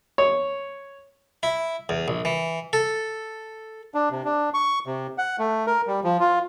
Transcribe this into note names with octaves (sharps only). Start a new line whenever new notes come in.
C#5
E4
E2
A#1
E3
A4
D4
C3
D4
C#6
C3
F#5
A3
A#4
G3
F3
F4